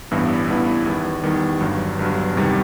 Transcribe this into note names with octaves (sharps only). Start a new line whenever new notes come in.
A1 G2 E3 B3 E4
A1 G2 E3 B3 E4
E2 D#3 G3
E2 D#3 G3
G1 G2 F#3
G1 G2 F#3
E2 C3 D#3 G3